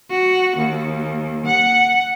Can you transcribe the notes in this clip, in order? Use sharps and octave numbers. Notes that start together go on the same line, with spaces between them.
F#4
D#2
F#5